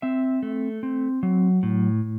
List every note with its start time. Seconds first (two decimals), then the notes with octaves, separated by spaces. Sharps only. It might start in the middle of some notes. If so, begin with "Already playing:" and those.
0.02 C4 E5
0.43 A3
0.83 C4
1.23 F#3
1.63 A2